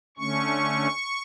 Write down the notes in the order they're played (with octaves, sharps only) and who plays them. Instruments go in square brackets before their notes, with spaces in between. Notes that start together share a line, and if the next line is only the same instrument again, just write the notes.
[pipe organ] D3 A3 C#4 C#6